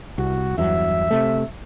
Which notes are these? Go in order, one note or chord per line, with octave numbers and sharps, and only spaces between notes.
C2 F#4
E2 G2 F#3 E5
C3 A3